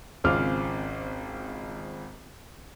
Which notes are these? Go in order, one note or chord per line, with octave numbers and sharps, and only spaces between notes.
G#1 C#3 C4 F4 D6 F6